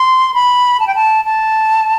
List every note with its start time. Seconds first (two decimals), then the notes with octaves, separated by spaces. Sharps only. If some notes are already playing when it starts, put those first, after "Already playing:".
Already playing: C6
0.34 B5
0.80 A5
0.87 G5
0.95 A5
1.25 A5